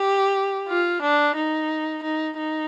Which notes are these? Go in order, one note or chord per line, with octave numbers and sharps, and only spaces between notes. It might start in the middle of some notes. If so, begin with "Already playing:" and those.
Already playing: G4
F4
D4
D#4
D#4
D#4